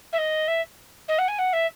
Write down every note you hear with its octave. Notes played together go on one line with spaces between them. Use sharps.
E5
D#5
E5
D#5
F#5
G#5
F#5
E5